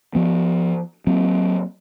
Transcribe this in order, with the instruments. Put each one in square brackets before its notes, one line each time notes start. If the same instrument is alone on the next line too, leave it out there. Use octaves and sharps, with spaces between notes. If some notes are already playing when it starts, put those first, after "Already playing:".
[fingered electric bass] F3 B3
F#3 A#3 C4